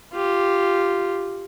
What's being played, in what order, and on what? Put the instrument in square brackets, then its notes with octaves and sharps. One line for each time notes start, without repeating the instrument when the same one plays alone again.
[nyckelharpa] F4 G4